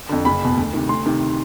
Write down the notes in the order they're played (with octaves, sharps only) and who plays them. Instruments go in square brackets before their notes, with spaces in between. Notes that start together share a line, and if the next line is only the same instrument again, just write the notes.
[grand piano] F2 D3
F#1 B5
E2 B2
D2
C3 D#3
D2 C6
C3 D#3